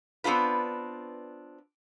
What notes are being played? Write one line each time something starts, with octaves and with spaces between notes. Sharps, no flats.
B3 C4 D4 F4 B4